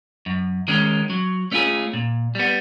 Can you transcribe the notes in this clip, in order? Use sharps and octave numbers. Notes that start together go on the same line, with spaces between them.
F#2
D#3 G#3 C#4
F#3
A3 C#4 F4 G#4
A#2
G3 B3